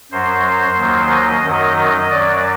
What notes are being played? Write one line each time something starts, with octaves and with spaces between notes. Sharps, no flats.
F#2 F#3 C5
D#2 D#3 F#3
D#5
F#2 D#3 F#3
F#2 F#3 D5